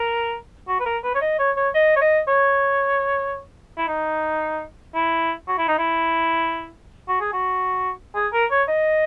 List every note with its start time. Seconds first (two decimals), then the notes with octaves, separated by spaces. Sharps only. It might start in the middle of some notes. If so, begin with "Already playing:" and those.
Already playing: A#4
0.68 F#4
0.80 B4
0.86 A#4
1.03 B4
1.15 C#5
1.21 D#5
1.39 C#5
1.56 C#5
1.74 D#5
1.96 C#5
2.01 D#5
2.28 C#5
3.77 E4
3.88 D#4
4.95 E4
5.48 F#4
5.58 E4
5.68 D#4
5.78 E4
7.08 F#4
7.20 G#4
7.33 F#4
8.15 G#4
8.33 A#4
8.50 C#5
8.68 D#5